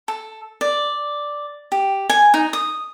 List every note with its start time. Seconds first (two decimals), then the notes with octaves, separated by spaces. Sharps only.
0.08 A4
0.61 D5
1.72 G4
2.09 G#5
2.34 D#4
2.53 D#6